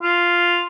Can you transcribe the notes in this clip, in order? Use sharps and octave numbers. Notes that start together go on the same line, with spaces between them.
F4